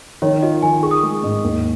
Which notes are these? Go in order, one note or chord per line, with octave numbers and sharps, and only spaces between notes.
D#3 C#5
F4 D#5
D#3 G#5
G#4 C#6
D#6
G#3 C#6
G#2
D#2